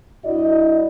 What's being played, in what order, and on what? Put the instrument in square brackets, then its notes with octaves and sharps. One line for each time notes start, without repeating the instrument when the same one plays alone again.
[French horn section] G2 E4 F#4 D5 D#5